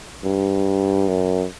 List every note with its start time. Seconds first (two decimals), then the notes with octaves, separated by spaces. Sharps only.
0.24 G2
1.08 F#2